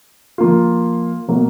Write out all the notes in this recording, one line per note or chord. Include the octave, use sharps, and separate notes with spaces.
F3 A#3 F4
B2 F#3 A#3